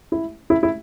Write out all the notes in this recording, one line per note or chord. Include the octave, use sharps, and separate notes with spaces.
E4
E4
E4